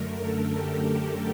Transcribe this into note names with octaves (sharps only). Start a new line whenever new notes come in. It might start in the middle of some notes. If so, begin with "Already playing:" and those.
Already playing: F#2 D3 A3 A#4
A4
G4
G4